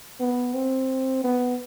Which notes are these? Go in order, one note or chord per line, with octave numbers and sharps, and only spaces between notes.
B3
C4
B3